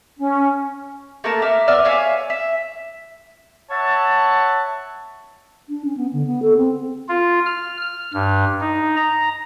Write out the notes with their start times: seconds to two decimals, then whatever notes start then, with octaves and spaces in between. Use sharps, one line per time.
0.18 C#4
1.24 A3 A#3 A#4 A5
1.42 E5 D6 F6
1.68 B3 D5 E5 F6
1.85 C#5 E5 F5 G#5
2.30 E5
3.71 C#5 E5 F#5 A5
5.69 D4
5.85 C#4
5.97 B3
6.13 D3
6.27 B3
6.42 A4
6.57 C4
7.09 F4
7.46 F6
7.82 F6
8.14 G2
8.60 D#4
8.96 A#5